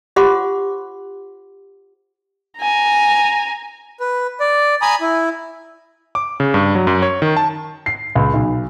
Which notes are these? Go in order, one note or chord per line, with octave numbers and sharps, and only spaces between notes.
F4 G4 C5 F#5 C6 D6
G#5 A#5
B4
D5
G#5 A#5 B5 D#6
E4
D6
C#3
G2
F#3
F#2
C#5
D#3
A5
C7
C#2
B1